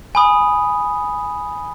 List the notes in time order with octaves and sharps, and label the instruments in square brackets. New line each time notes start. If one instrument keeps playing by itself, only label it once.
[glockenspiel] G#5 B5 D#6